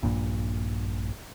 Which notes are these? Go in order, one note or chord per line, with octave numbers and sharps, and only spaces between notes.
A#1 G2 A#2